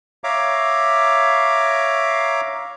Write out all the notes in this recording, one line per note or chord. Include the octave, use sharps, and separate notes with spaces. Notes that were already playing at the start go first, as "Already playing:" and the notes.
C#5 E5 F5 A#5 D6